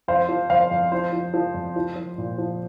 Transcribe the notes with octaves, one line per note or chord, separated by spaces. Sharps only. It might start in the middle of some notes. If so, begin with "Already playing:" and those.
F2 C5 F5
F3
F2 C5 F5
F2
F3 C5
F3
F3
F2
F3
F3
A#2
F3